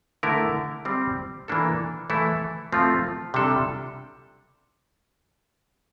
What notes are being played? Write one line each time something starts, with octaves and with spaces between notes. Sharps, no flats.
D3 A3 E4 A#4
G3 C4 G4
E3 A#3 D4 A4
E3 A3 E4 A4
F3 A3 C4 F4
C3 G3 D4 A4